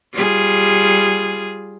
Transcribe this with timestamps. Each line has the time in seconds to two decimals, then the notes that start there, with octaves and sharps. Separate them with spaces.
0.13 G3 F4 G#4